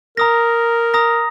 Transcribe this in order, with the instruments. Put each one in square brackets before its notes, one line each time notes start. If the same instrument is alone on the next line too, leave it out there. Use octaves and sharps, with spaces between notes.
[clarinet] A#4 [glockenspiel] A#5 D#6 A#6
[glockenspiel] A#5 D#6 A#6